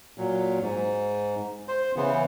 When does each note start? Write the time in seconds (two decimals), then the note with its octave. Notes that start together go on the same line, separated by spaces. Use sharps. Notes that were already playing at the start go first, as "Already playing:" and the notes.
0.18 A#2 F#3
0.61 G#2
1.68 C5
1.96 C#3 E3 B3